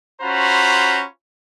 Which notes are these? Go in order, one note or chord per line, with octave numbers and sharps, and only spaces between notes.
C#4 F4 F#4 C5 A#5 B5